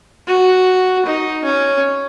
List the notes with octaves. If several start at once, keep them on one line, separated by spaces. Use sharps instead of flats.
F#4
D#4
C#4